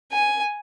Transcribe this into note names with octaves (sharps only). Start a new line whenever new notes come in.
G#5